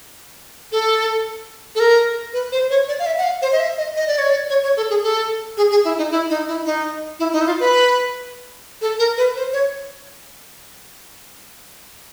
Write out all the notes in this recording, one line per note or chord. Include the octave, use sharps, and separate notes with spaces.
A4
A4
A#4
B4
C5
C#5
D5
F5
E5
F#5
F5
C5
D#5
E5
D#5
D#5
D5
C#5
D5
C#5
C#5
A4
G#4
A4
G#4
G#4
E4
D#4
E4
D#4
E4
D#4
E4
D#4
E4
F4
B4
A4
A#4
B4
C5
C#5